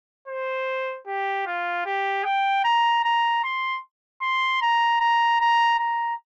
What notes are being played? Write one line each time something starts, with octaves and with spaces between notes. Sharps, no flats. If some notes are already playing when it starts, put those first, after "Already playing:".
C5
G4
F4
G4
G5
A#5
A#5
C6
C6
A#5
A#5
A#5
A#5